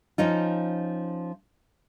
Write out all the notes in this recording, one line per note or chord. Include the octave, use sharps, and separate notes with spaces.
F3 C#4 D#4 F4